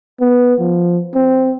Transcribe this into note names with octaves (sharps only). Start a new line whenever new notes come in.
B3
F3
C4